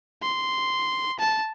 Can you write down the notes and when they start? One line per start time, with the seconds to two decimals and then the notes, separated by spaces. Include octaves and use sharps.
0.22 C6
1.19 A5